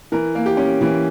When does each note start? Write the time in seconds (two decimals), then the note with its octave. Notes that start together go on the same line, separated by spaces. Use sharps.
0.12 E3 A#4
0.35 A#3
0.46 G4
0.57 C#4
0.81 E3